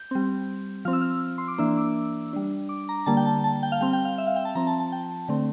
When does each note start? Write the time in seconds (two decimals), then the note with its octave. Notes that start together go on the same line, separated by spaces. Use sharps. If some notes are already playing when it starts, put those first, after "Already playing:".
Already playing: G6
0.11 G3 C4
0.85 F3 C4 F6
0.93 E6
1.01 F6
1.38 C6
1.48 D6
1.58 E3 A#3 D4 E6
1.77 D6
2.33 G3 D4
2.69 D6
2.89 A#5
3.06 D3 G3 A#3 A5
3.17 G5
3.25 A5
3.44 A5
3.63 G5
3.72 F5
3.81 G3 C4 G5
3.93 G5
4.05 F5
4.18 E5
4.27 F5
4.36 G5
4.45 A5
4.55 F3 C4 A#5
4.67 A5
4.80 A5
4.92 G5
5.28 D3 A3 C4